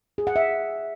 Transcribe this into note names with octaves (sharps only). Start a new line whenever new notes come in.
G#4
F#5
E5